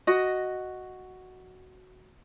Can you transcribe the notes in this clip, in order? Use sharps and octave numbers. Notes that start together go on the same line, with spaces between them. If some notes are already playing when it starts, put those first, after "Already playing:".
F#4 D#5